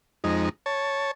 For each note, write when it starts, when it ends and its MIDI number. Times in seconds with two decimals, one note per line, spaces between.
0.24 0.49 41
0.24 0.49 56
0.24 0.49 63
0.66 1.11 73
0.66 1.11 81